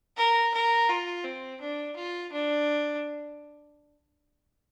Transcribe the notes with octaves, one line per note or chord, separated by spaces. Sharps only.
A#4
A#4
F4
C4
D4
F4
D4